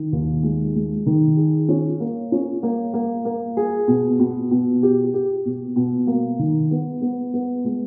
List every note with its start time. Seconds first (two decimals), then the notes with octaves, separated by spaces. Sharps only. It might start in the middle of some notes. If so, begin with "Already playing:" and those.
Already playing: D#3
0.12 D#2
0.43 G#3
0.75 G#3
1.06 D#3
1.37 G#4
1.69 C#4
2.00 A#3
2.32 C#4
2.63 A#3
2.94 A#3
3.25 A#3
3.57 G#4
3.88 B2
4.20 B2
4.51 B2
4.83 G4
5.14 G4
5.46 B2
5.76 B2
6.07 A#3
6.39 D#3
6.71 B3
7.02 B3
7.34 B3
7.65 G#3